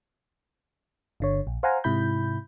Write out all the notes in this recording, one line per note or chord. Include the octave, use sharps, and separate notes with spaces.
G1 D3 C#5
A#1
C5 F5 F#5 G#5 A#5
G#2 C3 E4 B5 G6